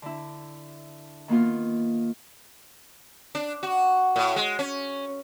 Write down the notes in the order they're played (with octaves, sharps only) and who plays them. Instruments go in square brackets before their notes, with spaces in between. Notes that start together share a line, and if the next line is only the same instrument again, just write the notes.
[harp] D3 E4
D#3 A#3 B3 F4
[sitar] D4
F#4
A2
G#3
C#4